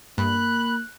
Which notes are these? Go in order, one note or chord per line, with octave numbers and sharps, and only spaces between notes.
G2 A#3 B5 F#6